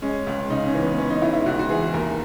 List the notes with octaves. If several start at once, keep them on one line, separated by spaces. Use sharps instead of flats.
G#3 C#4
C#2
C#3 D#4
C#4
E3
B3
E3 C#4
D#4
C#2 E4
E4
C#2 F#4
F#4
E3 G#4
D#2 A#4